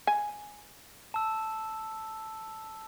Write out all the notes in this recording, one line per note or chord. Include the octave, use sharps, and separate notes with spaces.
G#5
A5 E6